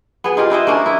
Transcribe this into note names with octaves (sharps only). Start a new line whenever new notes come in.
B3 G#4
D#4 F4 G4 A#4
D4 E4 C5 D#5
A#3 C#4 D4 A#4
E4 D#5